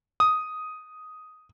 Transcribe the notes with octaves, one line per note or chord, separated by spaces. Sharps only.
D#6